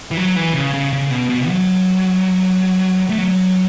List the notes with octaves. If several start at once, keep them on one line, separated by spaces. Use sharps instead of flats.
E3
F#3
E3
C#3
C#3
C#3
B2
B2
F#3
A3
F#3